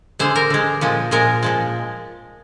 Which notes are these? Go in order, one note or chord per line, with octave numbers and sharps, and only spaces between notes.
D3 G#3 C5
A#4
D3 G#3
A#2 F3 G#3
A#2 F3 G#3 A#4
A#2 F3 G#3